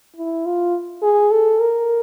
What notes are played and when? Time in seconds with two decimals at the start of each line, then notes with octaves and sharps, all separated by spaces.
0.16 E4
0.46 F4
1.02 G#4
1.31 A4
1.61 A#4